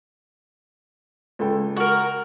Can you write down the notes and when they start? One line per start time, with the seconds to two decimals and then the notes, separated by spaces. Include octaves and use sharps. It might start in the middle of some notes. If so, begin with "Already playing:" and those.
1.39 C#2 A4 G5
1.77 F#4 A#4